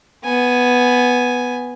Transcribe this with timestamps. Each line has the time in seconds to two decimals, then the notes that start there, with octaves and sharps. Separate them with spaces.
0.24 B3 G#5